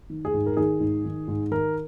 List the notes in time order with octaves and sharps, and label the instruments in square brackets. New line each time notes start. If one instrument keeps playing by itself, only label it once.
[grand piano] D#3
G#4
G#2
A#4
D#3 G#4
G#2
D#3
G#2
D#3 A#4